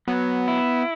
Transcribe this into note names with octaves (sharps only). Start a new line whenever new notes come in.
F#3 B3
E4